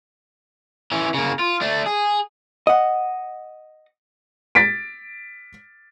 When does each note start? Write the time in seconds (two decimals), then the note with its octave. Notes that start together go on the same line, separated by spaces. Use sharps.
0.92 E3 C#4
1.14 C#3 A#3
1.39 F4
1.61 A3 D4
1.86 G#4
2.67 D#5 F#5
4.55 A6 B6 D7